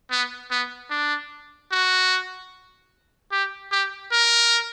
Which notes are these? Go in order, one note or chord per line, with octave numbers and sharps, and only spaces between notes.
B3
B3
D4
F#4
G4
G4
A#4